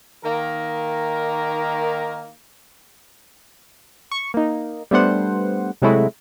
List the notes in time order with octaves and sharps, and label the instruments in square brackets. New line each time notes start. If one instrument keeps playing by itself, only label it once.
[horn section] D#3 A#3 A#4
[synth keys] C#6
A#3 D#4
G3 A3 B3 D4 C5 F#5
C3 F#3 G#3 A3 E4 F#4